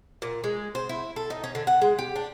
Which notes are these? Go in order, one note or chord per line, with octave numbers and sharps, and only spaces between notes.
A#2
G#3
C5
E4
A4
D#4
C#4
D3
F#5
G#3
G4
D4